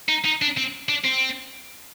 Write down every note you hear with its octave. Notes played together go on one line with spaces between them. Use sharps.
D#4
D#4
D4
C4
D4
C4